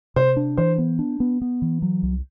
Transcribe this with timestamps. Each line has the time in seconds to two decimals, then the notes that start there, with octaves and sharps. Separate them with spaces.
0.16 C3 C5
0.37 D4
0.57 E3 C5
0.78 B3
0.99 D4
1.20 B3
1.41 B3
1.62 E3
1.82 F#3
2.03 C2